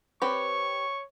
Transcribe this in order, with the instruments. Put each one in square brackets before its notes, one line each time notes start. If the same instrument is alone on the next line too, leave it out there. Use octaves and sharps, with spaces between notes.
[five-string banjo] C4 G4 B4 [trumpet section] C#5 C#6